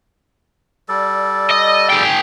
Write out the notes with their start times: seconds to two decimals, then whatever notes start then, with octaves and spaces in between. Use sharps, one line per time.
0.89 G3 A4 D5
1.51 D#5
1.90 G#4 G5